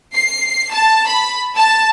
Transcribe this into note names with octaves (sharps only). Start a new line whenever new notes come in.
C7
A5
B5
A5